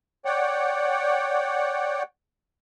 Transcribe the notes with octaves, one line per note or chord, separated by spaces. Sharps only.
C#5 D5 F#5 G5